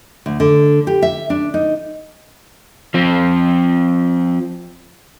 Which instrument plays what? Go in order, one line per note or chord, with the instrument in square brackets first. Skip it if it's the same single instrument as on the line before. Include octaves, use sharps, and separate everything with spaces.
[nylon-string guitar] D2
D3
G4
E5
D4
D#4
[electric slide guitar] F3 C4